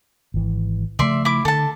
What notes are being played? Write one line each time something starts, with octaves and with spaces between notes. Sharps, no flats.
G#1 E3
C#3 F3 A3 D5 E5 C6
E4 D6
D3 A4 A5